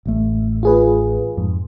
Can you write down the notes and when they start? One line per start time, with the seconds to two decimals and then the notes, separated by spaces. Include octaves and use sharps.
0.06 A1 A3
0.63 F4 G#4 B4
1.37 F2 G#2